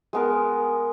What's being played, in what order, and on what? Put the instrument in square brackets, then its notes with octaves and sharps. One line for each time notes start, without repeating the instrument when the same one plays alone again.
[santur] G#3 B3 A#4